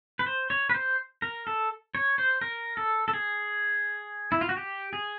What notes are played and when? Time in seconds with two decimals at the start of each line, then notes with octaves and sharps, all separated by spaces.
0.19 B4
0.26 C5
0.50 C#5
0.70 B4
0.74 C5
1.22 A#4
1.47 A4
1.95 C#5
2.18 C5
2.41 A#4
2.77 A4
3.08 A4
3.13 G#4
4.32 E4
4.41 F4
4.49 F#4
4.57 G4
4.93 G#4